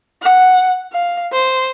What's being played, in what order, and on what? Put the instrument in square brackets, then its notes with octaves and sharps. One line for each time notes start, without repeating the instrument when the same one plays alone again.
[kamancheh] F#5
F5
C5